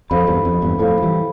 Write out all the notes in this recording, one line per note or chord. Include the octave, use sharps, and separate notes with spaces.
F2 A4 C5 F5 B5
E2 G2
F2
E2 G2
F2 A2 A4 C5 F5 B5
E3 G3